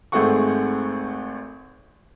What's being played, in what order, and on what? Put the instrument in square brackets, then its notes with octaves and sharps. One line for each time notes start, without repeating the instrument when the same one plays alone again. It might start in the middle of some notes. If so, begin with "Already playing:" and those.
[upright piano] G#1 A3 C4 G#4 F#5 C#6